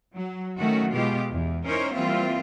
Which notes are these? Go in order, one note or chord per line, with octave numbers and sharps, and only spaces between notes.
F#3
D#3 F#3 A3 C#4 F#4
B2 G#3 F4 G4
E2
C#4 D#4 E4 A#4 C5 C#5
E3 G3 A#3 C4 F4 E5